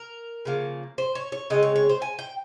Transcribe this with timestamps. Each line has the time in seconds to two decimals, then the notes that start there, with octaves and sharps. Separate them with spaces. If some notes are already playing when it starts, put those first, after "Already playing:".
Already playing: A#4
0.45 C#3 F3 A#3
0.98 C5
1.15 C#5
1.32 C#5
1.50 C#3 G#3 C4 D#5
1.63 C#5
1.76 C#5
1.89 C5
2.02 G#5
2.19 G5